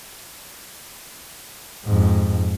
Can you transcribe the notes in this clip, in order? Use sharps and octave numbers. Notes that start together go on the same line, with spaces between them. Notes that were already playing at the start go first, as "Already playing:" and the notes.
F2 G#2